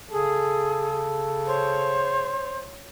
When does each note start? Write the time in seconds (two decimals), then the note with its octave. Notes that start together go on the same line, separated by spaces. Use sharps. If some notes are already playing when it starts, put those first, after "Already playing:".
0.11 C#3 G#4 A4
1.46 C5 C#5